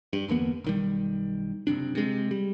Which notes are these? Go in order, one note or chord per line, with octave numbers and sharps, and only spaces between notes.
G2
G1 E2 A#3 B3
B1 D#3 G3
F#1 B1 C3 D4
C3 G#3
G3